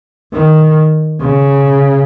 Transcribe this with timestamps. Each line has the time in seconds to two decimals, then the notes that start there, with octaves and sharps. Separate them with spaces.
0.33 D#3
1.20 C#3